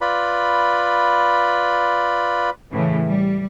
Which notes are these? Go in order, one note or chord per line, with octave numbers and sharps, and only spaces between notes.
F4 B4 D5 B5
A2 C#3 E3
G3